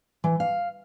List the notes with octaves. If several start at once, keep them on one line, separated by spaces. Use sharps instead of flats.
E3
F5